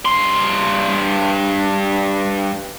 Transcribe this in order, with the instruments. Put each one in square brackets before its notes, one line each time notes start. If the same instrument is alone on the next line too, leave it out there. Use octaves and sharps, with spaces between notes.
[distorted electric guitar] G2 C6